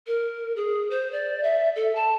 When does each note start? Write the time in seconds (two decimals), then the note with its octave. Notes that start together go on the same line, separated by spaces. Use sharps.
0.07 A#4
0.56 G#4
0.90 C5
1.12 D5
1.43 E5
1.76 A4
1.95 A5